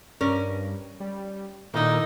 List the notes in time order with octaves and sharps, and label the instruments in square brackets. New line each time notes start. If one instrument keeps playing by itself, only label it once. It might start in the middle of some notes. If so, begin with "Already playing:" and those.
[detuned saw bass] G2 [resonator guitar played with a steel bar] C#4 A#4 D5
[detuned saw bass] G3
[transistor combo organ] A#2 [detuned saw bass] D#3 [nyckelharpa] D#4 [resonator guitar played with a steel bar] E4 A4